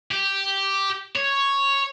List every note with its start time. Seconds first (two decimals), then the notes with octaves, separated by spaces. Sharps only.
0.11 G4
1.16 C#5